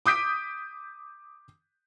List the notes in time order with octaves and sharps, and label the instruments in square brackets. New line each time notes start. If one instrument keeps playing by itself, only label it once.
[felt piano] D6 D#6 G6 B6 D7